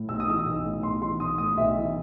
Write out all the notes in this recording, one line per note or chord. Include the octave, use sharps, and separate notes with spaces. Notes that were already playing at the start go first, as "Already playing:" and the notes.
Already playing: A2
B1 E6
D#6
E3 E6
B1
A2
B1 C6
E3 C6
B1 D#6
A2 D#6
B1 E5
E3